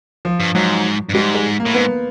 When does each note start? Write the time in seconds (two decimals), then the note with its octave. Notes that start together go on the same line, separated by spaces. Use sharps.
0.25 F3
0.40 G2
0.55 G#2 F#3
1.09 G2
1.14 G#2 G3
1.35 G#3
1.60 A#3
1.66 A2
1.74 G#2 B3